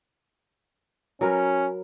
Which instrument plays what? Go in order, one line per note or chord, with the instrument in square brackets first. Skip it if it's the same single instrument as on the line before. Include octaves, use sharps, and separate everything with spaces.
[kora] F#3 A#4 B4 [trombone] C#4